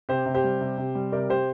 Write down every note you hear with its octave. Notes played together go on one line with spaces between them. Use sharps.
C3 G4 C5
C3
G4 C5
G3
C3
C3
G3
C3 A#4 D5
C3 G4 C5